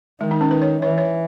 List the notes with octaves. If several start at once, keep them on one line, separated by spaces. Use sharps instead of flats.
D#3 G#3
D#4
C#4
B4
C#5
E3 C#5
C#5